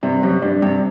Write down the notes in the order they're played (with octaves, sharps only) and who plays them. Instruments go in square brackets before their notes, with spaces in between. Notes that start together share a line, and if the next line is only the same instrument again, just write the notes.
[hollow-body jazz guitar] G2 [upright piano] C3
[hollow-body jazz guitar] F#2 [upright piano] G3
[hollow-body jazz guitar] G2 [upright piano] D4
[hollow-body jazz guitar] G2 [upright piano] C3